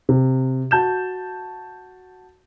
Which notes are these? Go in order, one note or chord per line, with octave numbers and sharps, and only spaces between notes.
C3
F#4 A5 G6 E7